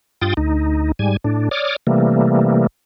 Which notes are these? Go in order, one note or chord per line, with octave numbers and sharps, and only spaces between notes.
G2 F4 G5 D#6 A6
D2 D#4
G#2 G3 G#5
A2 D4
C#5 D5 D6 D#6 F6
C3 E3 G3 A3 A#3